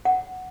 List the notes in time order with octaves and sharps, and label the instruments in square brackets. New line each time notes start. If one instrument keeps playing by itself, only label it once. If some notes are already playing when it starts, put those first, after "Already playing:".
[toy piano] F#5